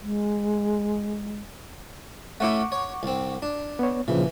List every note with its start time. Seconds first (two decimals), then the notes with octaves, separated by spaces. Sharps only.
0.01 G#3
2.40 A3 C#4 E4 F#5 C#6 D6
2.72 C#5
3.03 C2 C4
3.42 D4
3.79 B3 C#5
4.08 A#2 C#3 E3 F3